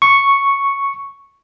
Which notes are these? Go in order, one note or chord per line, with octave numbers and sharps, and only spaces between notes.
C#6